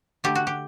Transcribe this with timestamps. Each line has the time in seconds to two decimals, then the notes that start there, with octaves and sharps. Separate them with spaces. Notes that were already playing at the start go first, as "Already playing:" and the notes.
0.24 D3 A3 G4
0.35 F#4
0.47 G4